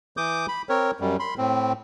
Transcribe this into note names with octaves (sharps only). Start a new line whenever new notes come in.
E3 D6 D#6 G6
B5
C4 A#4 C#5
F#2 G3
B5 C6
A2 C4